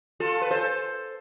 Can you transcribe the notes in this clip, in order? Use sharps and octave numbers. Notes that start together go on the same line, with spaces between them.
F4 A4
B4
A4 C5